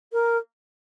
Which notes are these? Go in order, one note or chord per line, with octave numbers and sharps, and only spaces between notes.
A#4